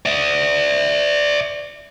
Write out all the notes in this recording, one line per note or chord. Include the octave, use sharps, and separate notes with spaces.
D5 E5